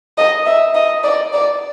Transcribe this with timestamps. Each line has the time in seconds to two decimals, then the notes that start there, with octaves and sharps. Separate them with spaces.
0.18 D#5
0.46 E5
0.75 D#5
1.04 D5
1.33 D5